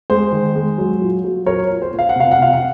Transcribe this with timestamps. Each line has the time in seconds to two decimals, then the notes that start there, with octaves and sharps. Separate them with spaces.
0.10 G#3 C5
0.32 D#3
0.56 G#3
0.78 F#3
1.01 A#2
1.24 F#3
1.46 A#2 A#4 C#5
1.70 A#2
1.82 C5
1.93 A#2
1.99 F5
2.09 F#5
2.16 C3 F5
2.31 F#5
2.38 C3 F5
2.53 F#5